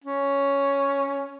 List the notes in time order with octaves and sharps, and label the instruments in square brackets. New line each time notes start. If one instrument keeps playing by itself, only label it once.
[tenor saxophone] C#4